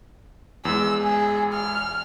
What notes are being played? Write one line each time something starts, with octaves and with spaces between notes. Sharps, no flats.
E2 G#3 E6
G#4
F6